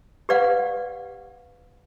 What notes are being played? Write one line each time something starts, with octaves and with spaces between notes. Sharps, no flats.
G4 B4 D5 F5 F#5